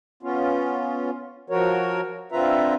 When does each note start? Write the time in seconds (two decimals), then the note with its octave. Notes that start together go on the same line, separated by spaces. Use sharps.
0.23 B3 C#4 F4
1.50 F3 F#4 A#4 C#5
2.32 D3 C4 F4 B4 E5 A#5